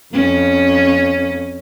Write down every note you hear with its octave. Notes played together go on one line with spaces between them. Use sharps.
F2 C#4